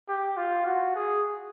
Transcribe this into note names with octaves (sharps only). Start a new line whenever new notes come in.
G4
F4
F#4
G#4